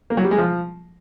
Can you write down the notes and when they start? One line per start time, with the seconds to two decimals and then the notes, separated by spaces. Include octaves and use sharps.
0.10 A#3
0.17 F#3
0.24 G3
0.31 G#3
0.38 F3